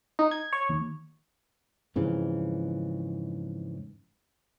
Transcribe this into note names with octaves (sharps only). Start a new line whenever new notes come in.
D#4
G#6
C#5
D#2
F2 G#2 C#3 E3